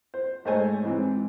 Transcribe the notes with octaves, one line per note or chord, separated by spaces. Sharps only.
C5
G#2 G#3 A3 C5 C#5 G#5
G#2 E3 C4